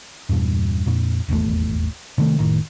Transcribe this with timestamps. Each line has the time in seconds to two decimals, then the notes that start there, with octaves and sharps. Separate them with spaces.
0.29 E2 G2 A#2
0.86 F2 A#2
1.28 D#1 G#1 E2 A3
2.18 C3 D#3 F3 A3
2.38 F1 B1 A2 D#3